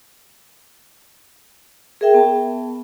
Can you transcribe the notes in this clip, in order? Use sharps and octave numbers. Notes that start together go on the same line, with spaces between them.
G#4 A#4 E5 G5
B3 A5